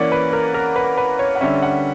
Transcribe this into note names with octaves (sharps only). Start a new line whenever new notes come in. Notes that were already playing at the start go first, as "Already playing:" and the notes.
Already playing: E3 A#3 C#4 D5 F#5
B4
A#4
A#4
B4
B4
C#5
F#5
D3 G3 C#4 E5
F#5